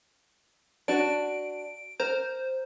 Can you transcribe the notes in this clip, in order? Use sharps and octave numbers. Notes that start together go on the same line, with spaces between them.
D4 F#4 D7
A#4 C5